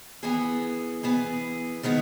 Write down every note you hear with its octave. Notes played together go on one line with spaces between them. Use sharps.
E3 B3 E4 G#4
E3 B3 E4 G#4
D#3 G#3 B3 E4